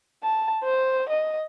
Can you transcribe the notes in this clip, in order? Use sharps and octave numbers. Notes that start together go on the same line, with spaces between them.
A5
C5
D#5